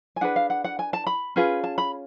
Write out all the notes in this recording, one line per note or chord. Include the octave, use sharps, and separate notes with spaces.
G#5
D4 G#4 B4 F#5
F5
F#5
F#5
G#5
A5
B5
C#4 F4 G#4 B4
A5
B5